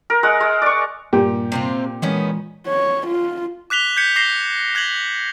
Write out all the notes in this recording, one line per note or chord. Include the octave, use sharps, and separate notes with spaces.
A#4
G#3 F#5
G#3
D5 C#6
G2 A#2 G4
C3 C4 F4
D#3 E3 G#3 B3 C#4
C#5
F4
D6 F#6 B6 F7 G7
G6 G#6 B6 C#7
D6 A#6 C7 G7
F#6 G#6 A#6 F#7 G7